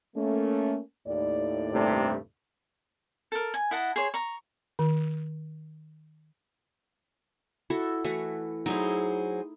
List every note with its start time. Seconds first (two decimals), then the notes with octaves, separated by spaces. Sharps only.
0.16 A3 A#3 C#4
1.07 D#2 A2 D5
1.72 G2 C3 A3
3.32 A4 A#4
3.54 G#5
3.71 E4 D#5 F#5 A5
3.96 G#4 C5 C#5
4.14 A#5 C#6
4.79 D#3
7.70 E4 F#4 A4
8.05 E3 A3 F#4
8.66 F#3 D#4 E4 G#4 C5